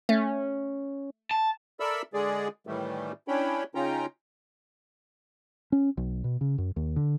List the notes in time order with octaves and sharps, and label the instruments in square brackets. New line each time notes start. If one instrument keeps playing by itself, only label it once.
[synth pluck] A3 [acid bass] C#4
[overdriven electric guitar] A5
[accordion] A4 A#4 D5 E5 B5 E6
D3 G#3 G#4 D5
A2 D#3 E3 G3 A3
C#4 D4 E4 C#5 G5 B5
C#3 C#4 D#4 F4 G5 A#5
[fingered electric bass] C#4
B1
B2
C#3
F#2
D#2
D3